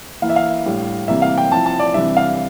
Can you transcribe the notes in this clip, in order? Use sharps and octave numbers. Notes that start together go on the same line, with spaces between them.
E3 A#3 E4 F5
E5
F5
A2 G3 D4
C3 E3 G3 A#3 E5
F5
G5
F3 C4 E4 A5
A5
D5
C3 E3 G3 D4 E5
F5